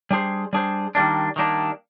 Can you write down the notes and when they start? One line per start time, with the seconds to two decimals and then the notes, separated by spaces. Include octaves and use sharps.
0.11 G3 D4 G#4 C5
0.53 G3 D4 G#4 C5
0.95 D#3 G3 A#3 D4
1.36 D#3 G3 A#3 D4